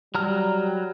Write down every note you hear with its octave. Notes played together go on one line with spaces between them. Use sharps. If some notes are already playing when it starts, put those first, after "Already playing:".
F#3 G3 A#5 F6